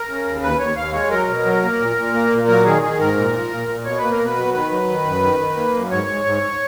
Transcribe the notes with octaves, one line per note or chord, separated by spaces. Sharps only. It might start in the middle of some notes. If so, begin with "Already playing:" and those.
Already playing: A#4
C#3
D#2
D#2 B4
D#2 C#5
D#2 F5
G#3 C#5
F#3 A#4
B2
F#3
A#3
A#2
A#2
A#3
A#2
F#3 A#4
D#3 G#4
D#3 G#4
G#2 A#4
A#2
F3
A#2
A#2
B2 C#5
A#3 B4
A#4
B2
B4
F#3
D#3 B4
F#3
D#3
F#2
D#3
D#3
A#3
F#2
G#2 C#5
G#2
G#2